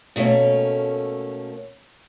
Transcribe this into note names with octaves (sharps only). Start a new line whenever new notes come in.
B2 A3 A#3 C#4